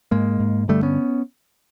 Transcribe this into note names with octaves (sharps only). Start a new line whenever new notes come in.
G#2 G#3 A#3
G#2
G2 D3 G3 A3
B3 C#4